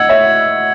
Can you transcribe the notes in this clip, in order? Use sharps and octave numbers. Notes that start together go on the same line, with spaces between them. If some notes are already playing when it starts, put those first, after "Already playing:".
Already playing: D#5 F#5 E6 G#6 C#7 F#7
C#5 E5